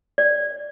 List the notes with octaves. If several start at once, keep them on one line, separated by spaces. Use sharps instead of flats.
D5